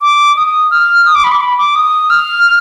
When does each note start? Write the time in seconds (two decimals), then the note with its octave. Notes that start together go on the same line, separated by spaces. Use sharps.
0.01 D6
0.36 D#6
0.71 F6
1.06 D#6
1.15 D6
1.24 B5
1.32 D6
1.41 B5
1.58 D6
1.76 D#6
2.10 F6